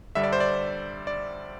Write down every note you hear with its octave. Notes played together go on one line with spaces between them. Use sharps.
G2 D3 G3 E5
D5
C5
D5
D5